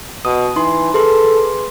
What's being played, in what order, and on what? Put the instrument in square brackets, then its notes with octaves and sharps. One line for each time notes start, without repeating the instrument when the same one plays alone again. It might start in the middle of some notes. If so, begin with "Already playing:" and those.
[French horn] B2 [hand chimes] D#6
[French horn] E3 [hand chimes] D#4 C6
[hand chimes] G#4 B4 C6 [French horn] A4